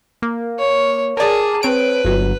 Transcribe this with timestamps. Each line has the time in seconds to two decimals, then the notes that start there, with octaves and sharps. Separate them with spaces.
0.22 A#3
0.59 C#5
1.17 G#4 A#4 D5 A5
1.63 C4 B4 C#5 D7
2.04 G1 F#3